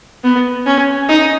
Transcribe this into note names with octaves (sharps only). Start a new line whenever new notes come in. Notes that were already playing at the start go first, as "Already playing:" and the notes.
B3
C#4
D#4